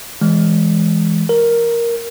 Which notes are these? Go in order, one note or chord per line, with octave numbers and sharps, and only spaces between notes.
E3 G#3
A#4